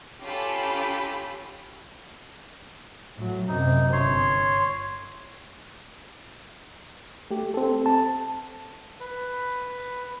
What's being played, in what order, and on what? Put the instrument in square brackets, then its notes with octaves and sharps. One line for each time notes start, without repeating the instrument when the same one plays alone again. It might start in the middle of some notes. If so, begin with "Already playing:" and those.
[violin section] C#4 F4 G4 A4 B5
[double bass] A2 F#3
[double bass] F#2 C3 [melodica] D#4
[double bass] G1 [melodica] C#5 C6
[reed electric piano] A3 G4
C4 A4
[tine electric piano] A5
[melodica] B4